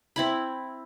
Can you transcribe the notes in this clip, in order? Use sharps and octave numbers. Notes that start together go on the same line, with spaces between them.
C4 E4 B5